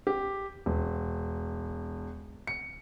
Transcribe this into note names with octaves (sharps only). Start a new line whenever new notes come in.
G4
E1
C#7